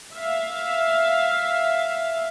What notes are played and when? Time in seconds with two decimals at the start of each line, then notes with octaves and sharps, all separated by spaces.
0.14 E5 F5